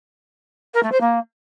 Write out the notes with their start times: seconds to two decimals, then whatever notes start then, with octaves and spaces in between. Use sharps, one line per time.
0.74 A#4
0.83 A3
0.91 C5
1.00 A#3